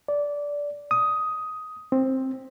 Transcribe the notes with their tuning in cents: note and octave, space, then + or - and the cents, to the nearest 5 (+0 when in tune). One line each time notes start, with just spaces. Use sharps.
D5 -15
D#6 +10
C4 +10